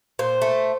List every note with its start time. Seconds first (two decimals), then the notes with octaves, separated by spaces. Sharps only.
0.19 A#2 C5
0.42 A3